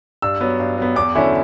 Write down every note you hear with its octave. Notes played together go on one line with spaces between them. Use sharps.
G2 E6
F#3 B3
G2
F#3 B3
E2 D6
D3 F#3 C#4 E4